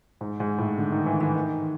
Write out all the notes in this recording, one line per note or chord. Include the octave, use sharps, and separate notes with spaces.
G#2
G#2
A2
D3
D#3
E3
E3
D#3